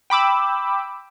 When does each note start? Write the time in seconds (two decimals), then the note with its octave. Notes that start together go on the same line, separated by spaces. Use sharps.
0.10 G5 B5 D6 E6